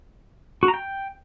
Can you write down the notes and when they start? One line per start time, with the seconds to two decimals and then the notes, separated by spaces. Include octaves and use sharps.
0.63 F#4
0.68 A#5
0.74 G5